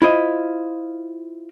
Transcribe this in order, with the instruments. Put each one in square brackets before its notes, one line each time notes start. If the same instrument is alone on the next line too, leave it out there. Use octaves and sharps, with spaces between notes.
[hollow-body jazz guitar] E4 F4 C5 D#5